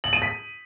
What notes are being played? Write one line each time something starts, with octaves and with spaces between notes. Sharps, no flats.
F#7
D#7
B6